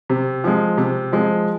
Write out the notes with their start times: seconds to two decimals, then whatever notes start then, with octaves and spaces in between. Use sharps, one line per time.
0.10 C3
0.44 F3 G#3
0.78 C3
1.12 F3 G#3